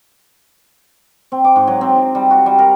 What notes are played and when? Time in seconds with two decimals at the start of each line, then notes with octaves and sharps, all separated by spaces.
1.32 C4
1.45 D6
1.56 G#2
1.67 F#3
1.81 C4
1.96 D#4
2.15 G3
2.31 F#4
2.46 G3
2.59 A#4